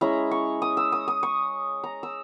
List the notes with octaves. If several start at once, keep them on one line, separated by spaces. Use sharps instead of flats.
G#3 C#4 E4 A#5
C#6
D#6
E6
D#6
D#6
C#6
A#5
E6